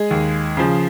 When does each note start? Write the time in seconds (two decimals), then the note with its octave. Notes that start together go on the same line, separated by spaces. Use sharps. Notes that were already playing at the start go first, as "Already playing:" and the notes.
Already playing: G#3 G#4
0.11 D#2
0.57 C#3 F3